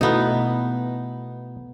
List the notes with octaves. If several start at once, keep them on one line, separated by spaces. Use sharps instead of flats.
B2 A3 B3 D#4 E4